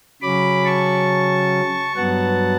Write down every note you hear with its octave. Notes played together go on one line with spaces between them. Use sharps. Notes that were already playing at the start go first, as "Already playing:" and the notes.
C#3 F#3 C#4 B5 D6
A5 C#6
G2 F#3 B3 F#5 A5